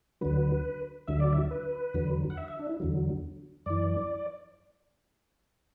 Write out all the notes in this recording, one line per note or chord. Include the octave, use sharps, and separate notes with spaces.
D2 D3 F#3 B4
D2 D3 F#3 E5
D5
E5
B4
E2 D3 F#3
F#5
E5
E5
D4
E4
E2 D3 F#3
F#2 E3 D5